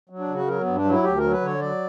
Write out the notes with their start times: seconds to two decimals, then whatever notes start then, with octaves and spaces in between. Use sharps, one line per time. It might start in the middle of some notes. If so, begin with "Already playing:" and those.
0.09 F#3
0.19 D4
0.28 C#3
0.34 F#4
0.47 F#3 A#4
0.61 B3
0.66 G2
0.75 D4
0.84 F#3
0.90 E4
1.04 D2 G4
1.17 A#4
1.23 F#3
1.32 B4
1.41 D3 C#5
1.59 F#3 D5